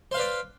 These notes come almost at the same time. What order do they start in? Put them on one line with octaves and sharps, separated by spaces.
C5 F5 B4 D5